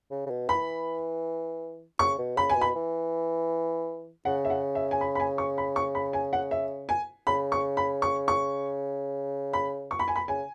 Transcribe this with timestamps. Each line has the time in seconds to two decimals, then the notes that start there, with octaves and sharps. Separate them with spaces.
0.11 C#3
0.26 C#3
0.30 B2
0.49 E3 B5
1.99 C#3 C#6
2.18 B2
2.37 C#3 B5
2.50 G#5
2.56 B2
2.61 B5
2.75 E3
4.25 C#3 F#5
4.45 E5
4.50 F#5
4.75 E5
4.91 G#5
5.01 B5
5.15 B5
5.20 G#5
5.38 C#6
5.58 B5
5.76 C#6
5.95 B5
6.13 G#5
6.33 F#5
6.51 E5
6.89 G#5
7.27 C#3 B5
7.52 C#6
7.77 B5
8.02 C#6
8.28 C#6
9.53 B5
9.91 C#6
9.99 B5
10.08 G#5
10.16 B5
10.28 C#3 G#5